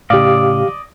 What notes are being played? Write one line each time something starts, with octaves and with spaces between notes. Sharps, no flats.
A2 C#3 G4 D5 D#5 F5